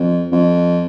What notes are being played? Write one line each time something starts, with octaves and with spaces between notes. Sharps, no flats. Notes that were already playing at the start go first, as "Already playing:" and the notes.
Already playing: F2
F2